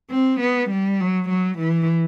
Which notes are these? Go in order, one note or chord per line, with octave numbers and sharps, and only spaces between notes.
C4
B3
G3
F#3
F#3
E3